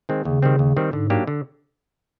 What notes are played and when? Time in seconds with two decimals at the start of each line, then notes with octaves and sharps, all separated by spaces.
0.09 D#3 G#3 C4
0.25 D#2 C#3
0.42 D#3 G3 C4
0.59 D#2
0.77 D#3 G3 C4
0.93 G#2 D3
1.10 F#3 A#3 D4 G4
1.27 D3